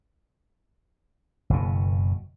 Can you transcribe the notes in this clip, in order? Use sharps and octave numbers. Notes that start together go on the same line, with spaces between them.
F#1 B2